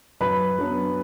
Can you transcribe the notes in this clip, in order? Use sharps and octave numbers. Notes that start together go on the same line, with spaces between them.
F#2 B4 B5
F#3 B3 D4